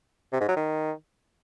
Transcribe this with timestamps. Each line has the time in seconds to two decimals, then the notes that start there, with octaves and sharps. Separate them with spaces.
0.33 C3
0.40 G#2
0.48 F#3
0.56 D#3